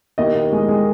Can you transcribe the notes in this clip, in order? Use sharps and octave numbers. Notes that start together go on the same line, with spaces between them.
D#2 D#5
D#2
G#3
G#3